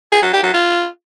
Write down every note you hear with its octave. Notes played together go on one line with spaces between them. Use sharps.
G#4
F#3
G4
F#3
F4